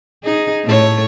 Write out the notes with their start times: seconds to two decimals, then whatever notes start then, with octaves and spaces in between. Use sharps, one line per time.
0.23 D#4 G#4
0.64 A2 A3 C#5